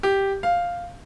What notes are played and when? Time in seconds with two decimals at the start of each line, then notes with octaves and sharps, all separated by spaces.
0.03 G4
0.43 F5